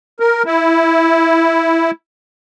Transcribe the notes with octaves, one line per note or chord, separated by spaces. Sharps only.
A#4
E4